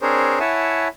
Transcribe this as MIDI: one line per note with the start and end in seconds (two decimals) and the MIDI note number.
0.01 0.39 60
0.01 0.39 62
0.01 0.39 68
0.01 0.39 70
0.01 0.39 72
0.01 0.39 73
0.40 0.88 64
0.40 0.88 73
0.40 0.88 76
0.40 0.88 78
0.40 0.88 80
0.40 0.88 81